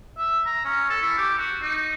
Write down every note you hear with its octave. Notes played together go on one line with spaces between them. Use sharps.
E5
A#5
C#4
A4
E4
G4
F#4
D#4